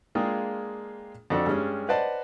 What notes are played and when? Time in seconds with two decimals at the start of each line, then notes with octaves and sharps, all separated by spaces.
0.15 G#3 A#3 D4 F4 G#4 G5
1.30 F2 C4 D4 F#4 A4
1.46 G2 G3 G#3 C#4
1.89 B4 C5 D5 D#5 F#5 A5